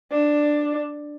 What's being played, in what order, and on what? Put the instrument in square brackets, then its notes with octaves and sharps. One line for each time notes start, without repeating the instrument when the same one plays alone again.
[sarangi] D4